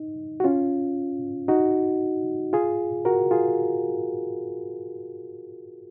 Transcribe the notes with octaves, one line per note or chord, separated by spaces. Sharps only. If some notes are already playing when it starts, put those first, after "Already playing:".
Already playing: D#4
F#4
C#4 F4
D#4 F#4
F4 G#4
F#4 A#4
F4 G#4